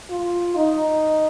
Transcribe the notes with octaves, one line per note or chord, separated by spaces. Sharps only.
F4
D#4